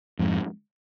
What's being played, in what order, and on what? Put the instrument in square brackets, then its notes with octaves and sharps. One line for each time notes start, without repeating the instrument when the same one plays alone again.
[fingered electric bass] F2 G#2